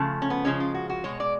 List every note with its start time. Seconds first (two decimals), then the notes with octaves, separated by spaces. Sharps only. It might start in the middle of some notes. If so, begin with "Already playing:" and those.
Already playing: C#3 F3 A3
0.22 C#4
0.30 B3
0.45 C#3 F3 G#3 C#4
0.60 F4
0.74 F#4
0.90 F#4
1.04 B2 G#3 C#5
1.20 D5